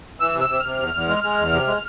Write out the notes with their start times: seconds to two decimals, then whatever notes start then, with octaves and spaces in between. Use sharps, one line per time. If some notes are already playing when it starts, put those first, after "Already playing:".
0.20 E3 E6
0.35 C3
0.40 E6
0.49 C3
0.60 C3 F6
0.79 E2
0.94 E2
1.08 G#3
1.24 G#3
1.39 E2
1.53 C3
1.67 G#3